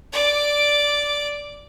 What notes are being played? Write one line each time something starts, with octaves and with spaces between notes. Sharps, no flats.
D5 D6